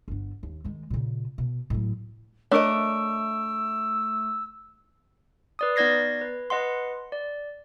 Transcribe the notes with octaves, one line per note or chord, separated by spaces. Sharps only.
G1 D3
D#2
D#3 G#3
A#2 C#3
B2
A2 F#3
A3 D4 A#4 C#5 D#5 C#6 E6 D7
B4 D5 D#6
B3 D#4 D5 G#6 A#6 C7
B4
B4 D#5 F#5 C6
D5